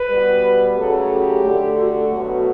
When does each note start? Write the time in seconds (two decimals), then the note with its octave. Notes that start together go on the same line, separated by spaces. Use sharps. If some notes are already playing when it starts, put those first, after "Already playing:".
Already playing: B4
0.09 B2 G3
0.77 C#3 F#3 A3 A4
1.10 G4
1.44 D3 A3
1.78 F#4
2.11 B2 F#3 A3